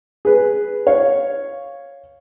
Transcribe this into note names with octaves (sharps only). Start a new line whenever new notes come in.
G#4 B4
C#5 F5